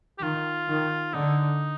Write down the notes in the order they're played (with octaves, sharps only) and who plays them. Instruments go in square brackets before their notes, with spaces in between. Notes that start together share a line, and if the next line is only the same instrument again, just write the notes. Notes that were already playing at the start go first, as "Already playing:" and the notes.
[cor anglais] G4
[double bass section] D#3 [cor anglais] F4
[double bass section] D#3
[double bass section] D3 [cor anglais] D#4